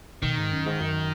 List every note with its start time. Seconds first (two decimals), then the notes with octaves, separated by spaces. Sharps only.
0.22 B2 D#3
0.37 G#2
0.51 F#2
0.66 G#2
0.80 F#2